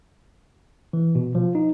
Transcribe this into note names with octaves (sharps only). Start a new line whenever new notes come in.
E3
B2
F3
D#4